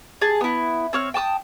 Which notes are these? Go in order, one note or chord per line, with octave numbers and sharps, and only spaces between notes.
G#4 A5
B3 E4
C4 C#5 F6
G5 A5 D6 D#6